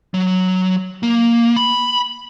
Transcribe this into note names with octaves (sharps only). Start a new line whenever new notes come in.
F#3
A#3
B5